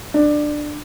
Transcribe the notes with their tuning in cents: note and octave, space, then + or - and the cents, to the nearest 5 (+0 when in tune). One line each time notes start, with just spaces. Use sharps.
D4 +15